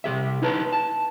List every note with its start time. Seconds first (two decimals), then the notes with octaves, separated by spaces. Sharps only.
0.04 C2 C#3 G4 E5
0.42 D#4 E4 B4 A5 A#5
0.73 A5